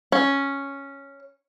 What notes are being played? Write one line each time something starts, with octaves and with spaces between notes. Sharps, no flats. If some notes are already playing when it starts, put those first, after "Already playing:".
C#4